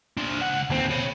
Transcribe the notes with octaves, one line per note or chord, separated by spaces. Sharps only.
D4 C5
C#2 F#5
D#2 C4
C#5 B5